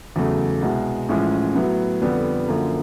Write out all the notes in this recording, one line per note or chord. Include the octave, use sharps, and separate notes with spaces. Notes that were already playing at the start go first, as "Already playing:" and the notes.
E2 C#3 F#3 A3
C2 B2 G#3
A1 A2 F3 G#3 C#4
A2 F#3 B3
F2 D3 G3 B3
F#2 D3 F3 A#3